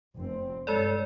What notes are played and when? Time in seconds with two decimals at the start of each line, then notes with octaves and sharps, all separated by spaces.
0.16 F1 C4
0.67 G2 G#3 A4 C#5 D5